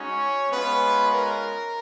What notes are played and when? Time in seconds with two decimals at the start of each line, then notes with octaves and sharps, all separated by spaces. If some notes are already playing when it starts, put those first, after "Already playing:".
Already playing: G#3 C#4 D#4 F#4 C#5
0.50 G#3 B3 C#4 F4 B4
1.12 A#4